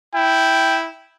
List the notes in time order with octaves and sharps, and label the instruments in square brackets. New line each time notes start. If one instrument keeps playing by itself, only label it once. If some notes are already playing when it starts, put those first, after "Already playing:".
[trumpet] E4 [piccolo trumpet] G5